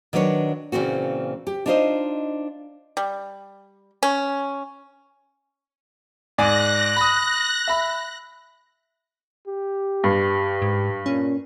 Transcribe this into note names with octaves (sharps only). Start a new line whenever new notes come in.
D#3 F#3 D4 B4 C#5
A#2 C#3 E3 C4 F#4
G4
D4 D#4 F4 B4 C5 D#5
G3
C#4
G#2 D5 G#5 F#6 A#6
B5 D#6
E5 B5
G4
G2
G#2
A#2 C#4